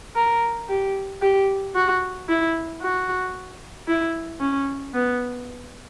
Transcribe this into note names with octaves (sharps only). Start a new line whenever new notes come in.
A#4
G4
G4
F#4
E4
F#4
E4
C#4
B3